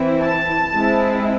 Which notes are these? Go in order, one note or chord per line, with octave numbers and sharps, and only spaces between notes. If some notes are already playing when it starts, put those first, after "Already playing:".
Already playing: E3 C4 E4
A5
G#3 C4 E4